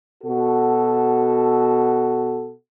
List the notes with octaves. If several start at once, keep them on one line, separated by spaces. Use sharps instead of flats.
B2 F#4 A4